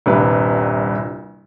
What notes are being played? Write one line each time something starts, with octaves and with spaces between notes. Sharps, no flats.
D#1 C2 G2 C3 B4